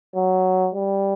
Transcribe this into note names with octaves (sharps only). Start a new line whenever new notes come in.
F#3
G3